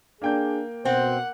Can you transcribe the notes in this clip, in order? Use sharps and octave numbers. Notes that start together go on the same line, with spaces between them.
A#3 D4 G#4 G5 G6
B2 C4 C5 F#5